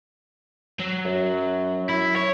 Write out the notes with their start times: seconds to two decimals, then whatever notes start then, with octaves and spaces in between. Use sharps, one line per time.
0.80 F#3
1.05 F#2
1.89 E4
2.16 C#5